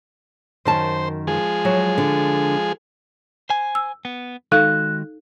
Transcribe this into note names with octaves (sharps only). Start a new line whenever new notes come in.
F#2 D#3 C5 A5
F3 G#3 G#4
F#3
D3
C5 G#5
E6
B3
D#3 G#3 D#4 F#4 A4 F5 F#6